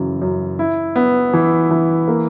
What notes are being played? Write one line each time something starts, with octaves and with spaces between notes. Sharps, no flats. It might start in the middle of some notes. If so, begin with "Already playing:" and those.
Already playing: F#2 C#3 E3
F#2
E4
B3
E3
E3
A#3